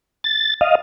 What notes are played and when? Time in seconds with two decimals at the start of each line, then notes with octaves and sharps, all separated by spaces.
0.24 A6
0.61 D#5 F5